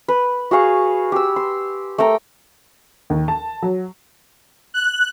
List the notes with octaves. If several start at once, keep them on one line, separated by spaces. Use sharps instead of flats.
B4
F#4 G#4 F5 C#6
G4 E6
C6
A3 A#4 G5 A#5
D#2
A5
F#3
F#6